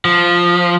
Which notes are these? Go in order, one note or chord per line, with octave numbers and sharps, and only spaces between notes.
F3